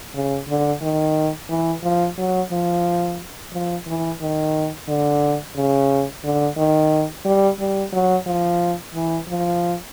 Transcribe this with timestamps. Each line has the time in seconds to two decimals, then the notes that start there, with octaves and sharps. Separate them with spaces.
0.14 C#3
0.49 D3
0.82 D#3
1.49 E3
1.83 F3
2.18 F#3
2.52 F3
3.53 F3
3.87 E3
4.21 D#3
4.88 D3
5.56 C#3
6.24 D3
6.57 D#3
7.25 G3
7.60 G3
7.92 F#3
8.26 F3
8.95 E3
9.28 F3